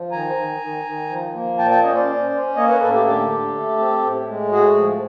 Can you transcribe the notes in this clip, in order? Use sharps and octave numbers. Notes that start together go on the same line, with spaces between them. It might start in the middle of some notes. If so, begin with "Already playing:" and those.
Already playing: F3
D#3 G#5 A#5
D#3
D#3
D#3
F3
A#3
A#2 G5 A5
G5 A5
C#4 C#5 D#5
C5 D5
C#4
C#4
A#3 C#5 D#5
B4 C#5
A2 A4 B4
G4 A4
D3 G4 A4
D3
A3
C4
A2
G#3
A2 F#4 G#4
F3